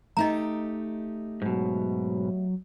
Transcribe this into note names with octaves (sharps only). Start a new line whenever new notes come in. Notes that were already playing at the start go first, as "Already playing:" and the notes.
A3 D#4 G4 D#5 A#5
G#2 B2 F#3